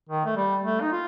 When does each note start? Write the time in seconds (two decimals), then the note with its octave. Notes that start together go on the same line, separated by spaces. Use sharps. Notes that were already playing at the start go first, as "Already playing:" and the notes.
0.09 D#3
0.25 A3
0.36 G3
0.64 A3
0.81 D#4
0.92 F4